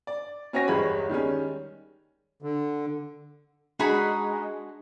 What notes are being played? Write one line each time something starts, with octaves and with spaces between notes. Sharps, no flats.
D5
C#4 F#4 C#5 G5 G#5 A#6
G1 E2 G3 G#3 C#5 B5
D#3 G3 G#3 C#4
D3
G#3 D4 D#4 F#4 G#4 B5